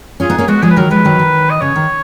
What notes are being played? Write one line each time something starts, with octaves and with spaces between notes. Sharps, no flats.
C#4 F4 G#4
B3 D#4
A#3 C#4
G#3 B3 F#4
F3 G#3 G#4
B4
D#3 F#3 A#4
F3 G#3 B4
D#3 F#3
D#3
D#5
C#3 C#5
D#3